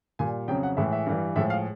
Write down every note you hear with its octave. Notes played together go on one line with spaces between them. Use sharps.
A#2 G3 G#5
F2 C#3 F#3 G5
F#5
A2 E3 G#3 E5
E5
G2 E3 G3
A2 F3 G#3 E5
F5